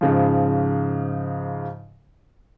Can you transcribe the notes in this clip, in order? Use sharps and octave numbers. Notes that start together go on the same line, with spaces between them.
G#2 C#3 F3